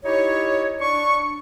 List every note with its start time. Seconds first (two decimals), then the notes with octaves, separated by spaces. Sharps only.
0.03 D#4 E4 G4 C#5
0.80 D4 C#6